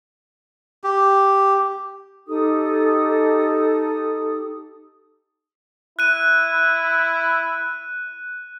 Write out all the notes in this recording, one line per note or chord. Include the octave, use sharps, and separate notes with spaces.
G4
D#4 G4 A4 D#6
E4 F#6 D#7